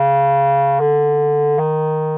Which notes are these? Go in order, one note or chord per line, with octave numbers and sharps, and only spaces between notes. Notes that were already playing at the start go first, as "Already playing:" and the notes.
Already playing: C#3
D3
D#3